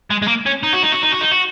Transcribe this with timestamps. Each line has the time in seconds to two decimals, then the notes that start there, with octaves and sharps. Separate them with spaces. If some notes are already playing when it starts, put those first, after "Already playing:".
0.10 G#3
0.22 G#3
0.28 A#3
0.46 C#4
0.63 D#4
0.73 F#4
0.83 D#4
0.92 F#4
1.03 D#4
1.12 F#4
1.21 D#4
1.32 F#4